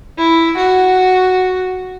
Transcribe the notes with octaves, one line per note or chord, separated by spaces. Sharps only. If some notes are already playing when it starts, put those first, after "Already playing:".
E4
F#4